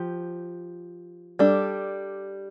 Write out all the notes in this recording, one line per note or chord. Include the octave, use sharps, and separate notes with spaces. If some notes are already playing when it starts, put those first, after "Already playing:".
Already playing: F3 G4
G3 D4 A4